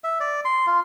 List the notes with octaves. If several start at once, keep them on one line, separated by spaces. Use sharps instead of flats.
E5
D5
C6
F4